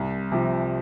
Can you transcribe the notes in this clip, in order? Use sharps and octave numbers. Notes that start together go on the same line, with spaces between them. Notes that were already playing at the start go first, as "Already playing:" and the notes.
Already playing: C2
C3 F3